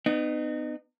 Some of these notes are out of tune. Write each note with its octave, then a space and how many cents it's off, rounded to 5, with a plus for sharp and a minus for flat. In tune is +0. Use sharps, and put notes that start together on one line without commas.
B3 +30 D#4 -30